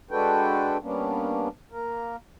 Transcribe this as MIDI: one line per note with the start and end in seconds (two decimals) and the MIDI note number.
0.11 0.77 56
0.11 0.77 62
0.11 0.77 66
0.11 0.77 69
0.11 0.77 71
0.11 0.77 79
0.83 1.49 55
0.83 1.49 58
0.83 1.49 59
0.83 1.49 61
0.83 1.49 62
1.72 2.16 58
1.72 2.16 70